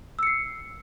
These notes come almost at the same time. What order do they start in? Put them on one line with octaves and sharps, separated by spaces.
E6 C#7 C7